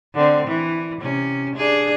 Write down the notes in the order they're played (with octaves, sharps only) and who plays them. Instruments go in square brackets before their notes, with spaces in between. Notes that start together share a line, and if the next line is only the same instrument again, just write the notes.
[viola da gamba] D3 C4
E3
C3 C#4
D4 G#4